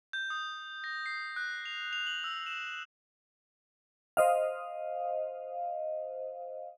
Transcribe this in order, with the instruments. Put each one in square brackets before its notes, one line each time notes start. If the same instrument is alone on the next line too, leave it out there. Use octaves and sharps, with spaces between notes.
[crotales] G6
D#6
A#6
C7
F#6
F7
F7
F#7
E6
E7
[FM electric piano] C5 D#5 F5